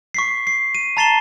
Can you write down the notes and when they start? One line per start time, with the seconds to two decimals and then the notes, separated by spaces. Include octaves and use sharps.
0.14 C#6 B6 C7
0.47 C7
0.75 D#7
0.97 A5 A#5 A6 C7 E7 G7